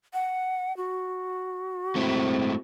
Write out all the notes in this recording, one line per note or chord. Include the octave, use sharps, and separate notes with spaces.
F#5
F#4
G#3 A3 C4 E4